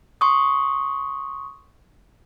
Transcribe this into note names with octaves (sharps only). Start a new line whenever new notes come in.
C6 C#6 D#6